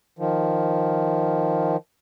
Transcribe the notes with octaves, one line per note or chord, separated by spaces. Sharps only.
D#3 F3